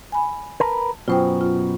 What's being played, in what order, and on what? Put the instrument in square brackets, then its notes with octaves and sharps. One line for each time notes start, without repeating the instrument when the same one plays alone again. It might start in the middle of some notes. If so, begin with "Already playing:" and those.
[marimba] G#5 B5
[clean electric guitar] A#4 B4 A#5 [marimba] A5
[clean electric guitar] F#2 B2 [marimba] F4 C5 G5
[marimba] F4